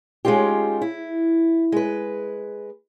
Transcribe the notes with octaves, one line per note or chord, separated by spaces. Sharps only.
G#3 C#4 D#4 F4 G4
E4
G#3 B4